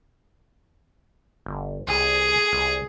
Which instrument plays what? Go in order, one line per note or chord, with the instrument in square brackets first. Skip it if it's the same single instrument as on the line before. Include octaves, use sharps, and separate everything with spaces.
[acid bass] G1
[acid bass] C2 [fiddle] G#4
[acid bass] C2